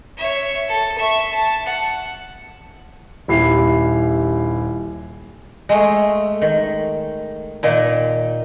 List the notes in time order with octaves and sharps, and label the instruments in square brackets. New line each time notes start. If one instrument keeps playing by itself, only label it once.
[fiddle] C#5 E5
A4
E5 C#6
A5
F#5
[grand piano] D#1 E4 G4 C7
[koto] G#3 A3
D#3
A#2 D#3